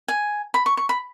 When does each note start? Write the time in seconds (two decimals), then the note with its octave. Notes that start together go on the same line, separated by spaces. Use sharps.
0.08 G#5
0.54 B5
0.66 C#6
0.77 C#6
0.89 B5